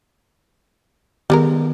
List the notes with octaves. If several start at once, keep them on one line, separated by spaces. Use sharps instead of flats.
D#3 G3 G#3 B3 A#4